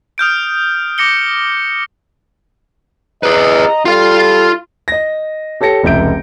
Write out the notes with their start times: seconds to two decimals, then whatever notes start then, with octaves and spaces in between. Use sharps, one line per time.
0.18 D#6 F6 G6 D7
0.98 D6 A#6 C#7 G7
3.23 G#4 B4 D#5 A#5
3.85 G3 F4 A4 F5
4.88 D#5 A#6
5.61 G4 A4 C#5 A#6 C#7
5.83 F1 C#2 E5 G6 D7